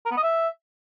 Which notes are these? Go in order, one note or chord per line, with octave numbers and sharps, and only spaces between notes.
A#4
B3
D#5
E5